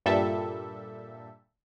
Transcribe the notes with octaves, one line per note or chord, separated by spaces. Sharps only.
G2 A#2 G3 A4 E5